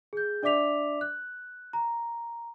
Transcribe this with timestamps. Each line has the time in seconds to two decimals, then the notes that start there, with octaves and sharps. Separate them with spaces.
0.13 G#4 G6
0.43 D4 D5 E5 D6 B6 F7
1.01 F#6
1.73 A#5